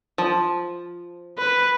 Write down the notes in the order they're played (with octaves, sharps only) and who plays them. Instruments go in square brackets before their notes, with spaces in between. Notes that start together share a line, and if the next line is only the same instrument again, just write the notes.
[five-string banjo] F3
[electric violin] B4